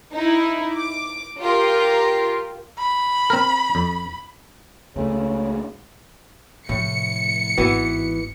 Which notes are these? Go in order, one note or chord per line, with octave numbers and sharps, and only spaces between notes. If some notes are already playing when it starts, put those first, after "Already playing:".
D#4 E4
D6
F4 G4 A#4
B5
C4 A#4
F2
C#2 C#3 A3
A2 C3 F3 C#7
G#1 E3 B3 F#4